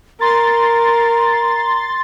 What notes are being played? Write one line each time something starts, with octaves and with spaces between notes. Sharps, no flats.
A#4 A#5 C6 A6